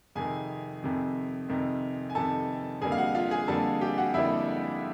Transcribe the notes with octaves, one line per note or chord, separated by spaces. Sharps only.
F2 C3 D#3 G#4 G#5
F2 C3 D#3
F2 C3 D#3
G#5
F2 C3 D#3 A4 A5
F2 D3 G3 A#3 G#4 G#5
F5
F#4 F#5
F4 F5
G#4 G#5
F2 D3 G3 A#3 A4 A5
G4 G5
F#4 F#5
F2 D3 G3 A#3 E4 E5